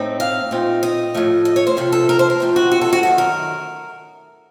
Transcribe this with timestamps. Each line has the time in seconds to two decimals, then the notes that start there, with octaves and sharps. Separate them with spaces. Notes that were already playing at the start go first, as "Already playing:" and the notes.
Already playing: A2 A3 C4 D#4
0.20 F5
0.51 A#2 A3 C4 D#4
0.83 D#5
1.14 A2 F3 A3
1.45 D#5
1.56 C#5
1.67 C5
1.77 C3 F3 A3 A4
1.92 A4
2.09 A#4
2.19 C5
2.30 A#4
2.40 C3 F3 A3 C4
2.56 F#4
2.72 F#4
2.81 A4
2.93 F#4
3.03 F#2 D#3 A3 F#4
3.18 A#4